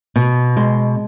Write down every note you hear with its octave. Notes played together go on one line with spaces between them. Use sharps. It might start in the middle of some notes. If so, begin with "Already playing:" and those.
B2
G#3